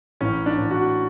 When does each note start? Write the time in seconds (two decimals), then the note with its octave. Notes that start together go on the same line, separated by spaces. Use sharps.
0.20 A1 C#4
0.46 D4
0.58 A1
0.71 F#4